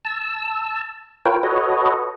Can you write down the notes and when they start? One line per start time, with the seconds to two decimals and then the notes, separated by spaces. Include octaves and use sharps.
0.05 A5 E6
1.25 F4 A#4 B4 C#5 G5
1.43 F#4 A4 B4 C#5 D#5